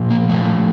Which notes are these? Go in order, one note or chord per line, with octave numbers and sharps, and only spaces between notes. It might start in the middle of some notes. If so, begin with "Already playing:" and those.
Already playing: A#2 F3
A#3
A2 F3 A3